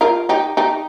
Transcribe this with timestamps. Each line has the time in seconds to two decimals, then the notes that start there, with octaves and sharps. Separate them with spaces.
0.01 F4 A#4
0.29 D#4 G4
0.57 D#4 G4